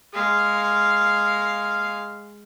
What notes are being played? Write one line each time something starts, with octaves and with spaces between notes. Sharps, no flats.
G#3 F5